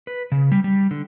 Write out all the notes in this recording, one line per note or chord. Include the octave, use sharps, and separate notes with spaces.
B4
C#3
G3
G3
D3